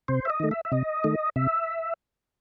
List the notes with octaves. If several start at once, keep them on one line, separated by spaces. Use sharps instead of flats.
C3 C5
E5
D#5
D#3 A3
E5
E5
C3 D#5
D#3 A3
C3 E5